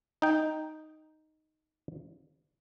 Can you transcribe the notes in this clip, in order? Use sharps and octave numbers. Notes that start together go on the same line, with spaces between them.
D#4 G5